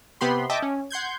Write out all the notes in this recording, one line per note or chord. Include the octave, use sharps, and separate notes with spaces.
C3 B3 G4 B5 C6
D#5 E5 G5 A5 D6
C#4
F#5 C6 G6 G#6